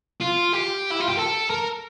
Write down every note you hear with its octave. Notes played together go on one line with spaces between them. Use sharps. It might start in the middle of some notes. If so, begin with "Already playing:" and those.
F4
G4
E4
F4
G4
A4
A#4